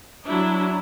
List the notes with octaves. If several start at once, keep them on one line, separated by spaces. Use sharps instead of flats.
F#3 D4 E4